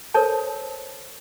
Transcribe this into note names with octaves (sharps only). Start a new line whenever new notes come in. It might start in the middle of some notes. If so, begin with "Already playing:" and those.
A4 A#4 C5 C#5 A5